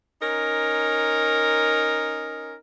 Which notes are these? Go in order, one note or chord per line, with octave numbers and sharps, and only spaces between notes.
C#4 D#4 A#4